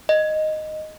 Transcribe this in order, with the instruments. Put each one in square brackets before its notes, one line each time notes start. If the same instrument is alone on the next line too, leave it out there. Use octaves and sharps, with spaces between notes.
[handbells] D#5